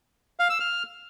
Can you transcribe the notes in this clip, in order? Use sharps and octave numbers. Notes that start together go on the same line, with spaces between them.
F5
E6
F6